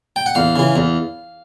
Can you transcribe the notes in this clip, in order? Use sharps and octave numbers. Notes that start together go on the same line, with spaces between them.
G5
F#5
E2 F5
C#3 E3
E2